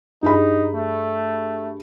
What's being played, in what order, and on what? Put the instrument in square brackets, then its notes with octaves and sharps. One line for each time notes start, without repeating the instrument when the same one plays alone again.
[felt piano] G2 G#4 B5 [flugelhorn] D#4
[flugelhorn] A3